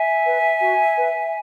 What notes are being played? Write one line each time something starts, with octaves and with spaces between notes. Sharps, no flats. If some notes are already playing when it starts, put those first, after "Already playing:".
Already playing: E5 G#5
B4
F#4
B4